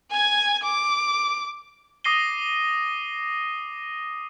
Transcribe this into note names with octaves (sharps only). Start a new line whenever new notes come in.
G#5 G#6
D6
D6 D#6 A#6 C7 D#7 G7